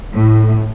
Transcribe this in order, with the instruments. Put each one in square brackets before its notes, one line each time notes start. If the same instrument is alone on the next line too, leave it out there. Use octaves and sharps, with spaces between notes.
[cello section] A2